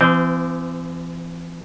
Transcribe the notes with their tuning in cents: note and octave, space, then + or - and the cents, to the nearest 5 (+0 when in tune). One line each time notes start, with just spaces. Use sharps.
E3 +40 C4 -30